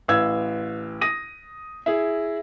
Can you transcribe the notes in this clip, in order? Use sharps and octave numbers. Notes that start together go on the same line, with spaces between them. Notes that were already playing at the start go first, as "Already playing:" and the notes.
A1 B4 F5 E6 G#6
D#6 A#6 D#7
E4 G#4